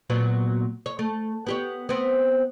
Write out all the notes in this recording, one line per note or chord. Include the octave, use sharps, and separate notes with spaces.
A#2 F#3 B3
C#5
A3
B3 G4 C#5
B3 C4